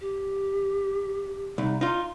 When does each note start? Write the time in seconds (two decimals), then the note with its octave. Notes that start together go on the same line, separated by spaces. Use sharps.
0.01 G4
1.58 C2 D#4
1.81 D#4 F4 C6